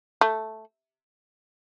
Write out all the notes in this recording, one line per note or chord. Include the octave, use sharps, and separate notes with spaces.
A3